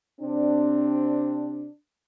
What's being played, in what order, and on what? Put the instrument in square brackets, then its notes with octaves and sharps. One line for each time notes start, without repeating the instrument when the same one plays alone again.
[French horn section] C3 C4 D4